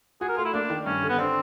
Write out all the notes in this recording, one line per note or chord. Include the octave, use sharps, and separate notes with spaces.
F#4 G#4
A#4
A3 F4
E4
A#3 D4
D#3
G2 C#4
D3
B3
C4 D4